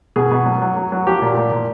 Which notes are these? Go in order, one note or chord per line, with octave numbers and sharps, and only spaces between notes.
B2 G#4
B2
F#3
F#3
F#3
F#3
F3 G4
A#2
A#2
A#2